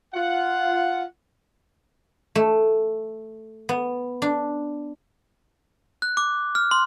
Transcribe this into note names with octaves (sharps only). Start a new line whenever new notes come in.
F4 F#5
A3
B3
D4
F#6
D6
F6
C6